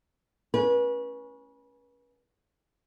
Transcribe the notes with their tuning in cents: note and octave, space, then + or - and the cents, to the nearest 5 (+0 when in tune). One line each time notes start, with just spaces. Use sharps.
C#4 +0 B4 -35